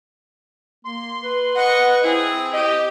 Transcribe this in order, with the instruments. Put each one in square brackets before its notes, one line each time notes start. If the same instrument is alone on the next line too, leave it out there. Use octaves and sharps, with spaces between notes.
[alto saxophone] A#3 [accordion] C6
[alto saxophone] B4
[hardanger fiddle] D#5 C#6 [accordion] F#5
[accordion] C4 [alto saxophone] E4 [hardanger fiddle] G#4
[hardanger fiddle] G4 [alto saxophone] D#5